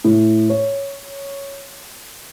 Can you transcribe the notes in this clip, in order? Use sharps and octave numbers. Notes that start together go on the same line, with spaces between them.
A2
C#5